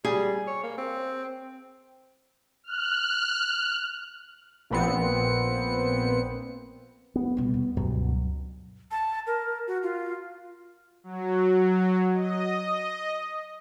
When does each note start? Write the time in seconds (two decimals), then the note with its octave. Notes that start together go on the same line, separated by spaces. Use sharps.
0.05 G3 G#4
0.47 C#5
0.63 A#3
0.77 C4
2.64 F6 F#6
4.70 A#1 A#2 B3 C4 C#7
7.16 B3
7.37 B2 G3
7.54 D#2
7.77 C#2 G2 B2 F#3
8.91 A5
9.27 A#4
9.67 F#4
9.83 F4
11.04 F#3
12.14 D#5